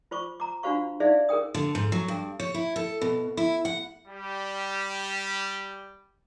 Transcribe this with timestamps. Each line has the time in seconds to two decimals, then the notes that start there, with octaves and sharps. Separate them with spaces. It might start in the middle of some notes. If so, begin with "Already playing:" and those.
0.11 F4 C5 C#6 D6
0.40 A#5 D6
0.63 D4 F4 F#4 C5 F5 C#6
1.00 D#4 G#4 C5 D5 E5 F5
1.29 G#4 A#4 G5 D#6
1.54 D3
1.75 G#2
1.92 F#3
2.08 G2
2.40 C#5
2.54 E4
2.76 A4
3.01 B2
3.37 E4
3.65 F#5
4.08 G3 G4